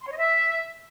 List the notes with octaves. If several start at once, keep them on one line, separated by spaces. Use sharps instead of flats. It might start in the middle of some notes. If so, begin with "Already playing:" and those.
C6
C#5
D#5
E5